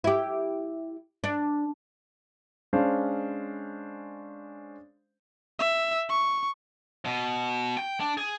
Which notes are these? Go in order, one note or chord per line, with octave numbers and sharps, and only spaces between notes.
E4 G4
D4
G#3 C#4 D4 C5 F5
E5
C#6
B2
G5
D4
G#4